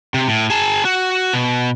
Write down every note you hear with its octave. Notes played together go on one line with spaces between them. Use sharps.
C3
A2
G#4 A5
F#4
B2